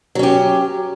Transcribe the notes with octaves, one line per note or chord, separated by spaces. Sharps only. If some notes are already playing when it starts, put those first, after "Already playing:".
F#3 C#4 G4